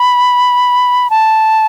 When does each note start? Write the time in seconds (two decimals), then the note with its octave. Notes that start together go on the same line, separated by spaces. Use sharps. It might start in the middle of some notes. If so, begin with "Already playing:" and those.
Already playing: B5
1.10 A5